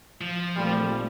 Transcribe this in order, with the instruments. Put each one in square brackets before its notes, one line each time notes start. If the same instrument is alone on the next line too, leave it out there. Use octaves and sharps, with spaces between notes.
[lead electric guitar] F3
[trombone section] G#1 A#2 [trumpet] G3 [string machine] A3